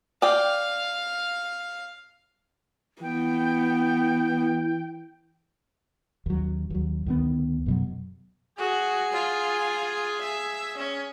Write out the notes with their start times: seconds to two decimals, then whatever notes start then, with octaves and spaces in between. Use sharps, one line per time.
0.22 D5 F5 G5
3.02 E3 B3 G5
6.26 D#2 F#3
6.70 D#2 F#3
7.06 D2 D#3 B3
7.66 F#2 B2 F#3
8.58 F#4 G#4 G#5
9.13 F4
10.21 E5
10.78 C#4